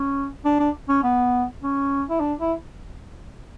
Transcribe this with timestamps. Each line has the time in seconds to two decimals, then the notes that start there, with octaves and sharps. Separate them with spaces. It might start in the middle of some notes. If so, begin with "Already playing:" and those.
Already playing: C#4
0.45 D4
0.60 D4
0.89 C#4
1.03 B3
1.62 C#4
2.09 E4
2.20 D4
2.39 E4